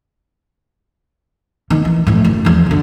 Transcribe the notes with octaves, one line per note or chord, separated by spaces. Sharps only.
D#3 B3
E3
F2 A2
F#1
E2 F3
F#2 D3